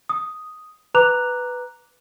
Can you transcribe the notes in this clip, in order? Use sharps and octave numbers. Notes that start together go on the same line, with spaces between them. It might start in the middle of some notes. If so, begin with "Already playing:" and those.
D#6
B4 A#5 D6 F#6 F7